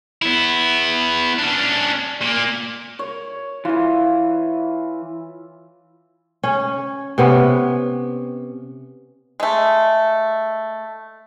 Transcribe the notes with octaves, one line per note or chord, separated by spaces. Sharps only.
B3 E4
C#4 D4
A#2 A#3
C#5
E3 E4 F4
C#4
C3 B3 C#4
G#3 A3